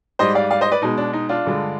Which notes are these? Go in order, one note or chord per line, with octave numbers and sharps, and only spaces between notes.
G#2 G3 C5 D#5
D5 F5
D5 F5
C5 D#5
B4 D5
B2 G#3 D#4
D4
D#4
D4 F4
G2 D3 G#3